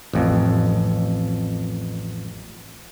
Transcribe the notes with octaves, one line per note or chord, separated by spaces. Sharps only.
A1 F2